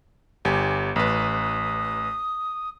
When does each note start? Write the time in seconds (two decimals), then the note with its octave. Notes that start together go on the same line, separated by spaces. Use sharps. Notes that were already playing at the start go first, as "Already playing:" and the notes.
0.45 G1 G4 G#5
0.96 A1 B4 D#6